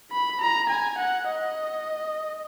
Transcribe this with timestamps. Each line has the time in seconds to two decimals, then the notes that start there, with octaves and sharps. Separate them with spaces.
0.12 B5
0.41 A#5
0.69 G#5
0.98 F#5
1.27 D#5